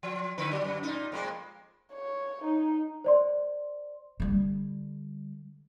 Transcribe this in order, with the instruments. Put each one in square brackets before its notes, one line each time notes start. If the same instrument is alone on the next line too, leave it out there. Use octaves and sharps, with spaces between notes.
[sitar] F3
D3 E4 B4
F#3
F#2
A#2 D#4
F2 G#3 A#3
[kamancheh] C#5
D#4
[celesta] C5 D5 C6
[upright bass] D3 G3